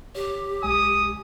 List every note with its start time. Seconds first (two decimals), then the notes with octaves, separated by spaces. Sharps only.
0.15 G4 C#5
0.63 B1 G#3 G#5 D#6